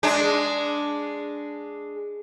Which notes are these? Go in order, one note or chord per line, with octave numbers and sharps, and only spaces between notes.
G#3 D4